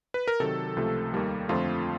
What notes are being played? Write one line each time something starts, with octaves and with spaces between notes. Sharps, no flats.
B4
A#4
C3 D#3 F#3 A4
C#2 C3 F3 A3
D#2 D#3 G3 A#3
F2 D3 F3 A3 C4 F4